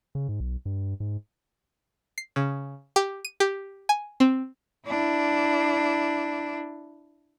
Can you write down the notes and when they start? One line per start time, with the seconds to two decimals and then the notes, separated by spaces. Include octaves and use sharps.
0.15 C#3
0.29 G#2
0.40 B1
0.65 G2
1.00 G#2
2.18 C7
2.36 C#3
2.96 G4
3.25 D#7
3.40 G4
3.89 G#5
4.20 C4
4.87 D4 E4